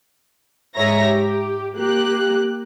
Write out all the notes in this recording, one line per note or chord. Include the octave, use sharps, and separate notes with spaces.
G#2 G#4 C#5 E5 A#5 A#6
G4
A#3 G4 F#6